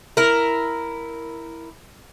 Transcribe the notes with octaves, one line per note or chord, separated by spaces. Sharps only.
E4 A#4